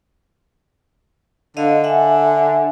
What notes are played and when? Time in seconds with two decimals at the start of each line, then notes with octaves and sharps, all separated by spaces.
1.57 D3 D#5 F5
1.84 E5 F#5 G#5